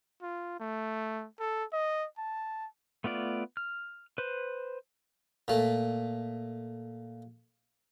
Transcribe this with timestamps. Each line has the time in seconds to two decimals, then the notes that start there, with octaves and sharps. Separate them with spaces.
0.22 F4
0.60 A3
1.39 A4
1.73 D#5
2.18 A5
3.04 A3 B3 F4 D5
3.57 F6
4.18 B4 C5
5.48 A#2 A3